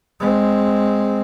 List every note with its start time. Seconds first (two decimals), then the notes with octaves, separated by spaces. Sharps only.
0.20 G#3 C4